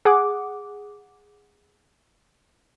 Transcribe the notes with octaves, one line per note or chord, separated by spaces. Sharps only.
G#4 F#5 D6